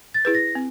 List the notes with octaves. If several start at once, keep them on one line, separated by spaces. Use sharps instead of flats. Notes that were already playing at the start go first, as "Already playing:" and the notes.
A6
E4 G#4 B4
A#6
C4